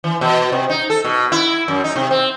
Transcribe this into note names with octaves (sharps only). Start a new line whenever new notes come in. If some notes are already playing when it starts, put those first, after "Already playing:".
E3
B2
C3
D#4
A4
B2
E4
F#2
D#4
C3
C4